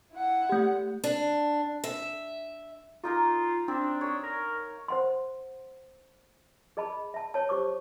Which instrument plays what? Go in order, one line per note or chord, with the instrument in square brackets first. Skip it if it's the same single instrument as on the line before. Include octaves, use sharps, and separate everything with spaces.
[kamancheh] E4 F#5
[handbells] A3 G4
[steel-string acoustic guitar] D4
E5
[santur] A#3 D#4 A#4 [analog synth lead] F4
[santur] C4 [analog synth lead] D4
[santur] C#5 D#6
[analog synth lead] A#4
[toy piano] C5 F#5 C6
G#4 D#5 A5 B5
E5 A5
C#5 A5
G4 C5 C#6 D6